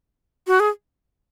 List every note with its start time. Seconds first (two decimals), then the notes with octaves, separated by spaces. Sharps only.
0.47 F#4
0.60 G#4